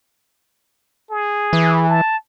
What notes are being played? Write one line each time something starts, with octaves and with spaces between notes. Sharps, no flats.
G#4
E3
A5